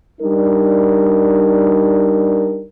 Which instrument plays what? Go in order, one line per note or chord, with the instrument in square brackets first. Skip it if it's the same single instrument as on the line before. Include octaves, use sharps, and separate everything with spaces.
[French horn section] G3 D4 D#4 A#4